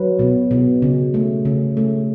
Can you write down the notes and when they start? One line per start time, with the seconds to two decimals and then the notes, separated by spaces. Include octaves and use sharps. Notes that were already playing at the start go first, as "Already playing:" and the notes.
Already playing: F#3 B4
0.19 B2
0.51 B2
0.82 C#3
1.14 A3
1.45 C#3
1.77 A3